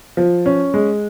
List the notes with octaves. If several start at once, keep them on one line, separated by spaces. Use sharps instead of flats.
F3
C#4
G#3